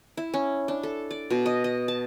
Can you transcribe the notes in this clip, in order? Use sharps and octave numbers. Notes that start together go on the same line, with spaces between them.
E4
C#4
D4
A4
D5
B2
D#5
D#5
A5